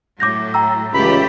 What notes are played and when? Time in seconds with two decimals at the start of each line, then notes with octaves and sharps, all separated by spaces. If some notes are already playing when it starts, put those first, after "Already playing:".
0.20 A2 F#3 D6 G6 A#6
0.54 G5 A#5 E6
0.94 C#2 E3 A3 G4 B5